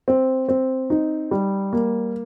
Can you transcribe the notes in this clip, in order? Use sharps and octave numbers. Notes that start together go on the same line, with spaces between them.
C4
C4
D#4
G3
A#3